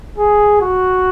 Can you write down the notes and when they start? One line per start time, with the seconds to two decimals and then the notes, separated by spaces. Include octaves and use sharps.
0.18 G#4
0.61 F#4